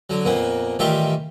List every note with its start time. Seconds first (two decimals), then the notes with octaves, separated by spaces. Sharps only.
0.10 D3 F#3
0.25 F2 A#2 A#3 B3
0.79 A1 D#3 G3 F4 G4 E5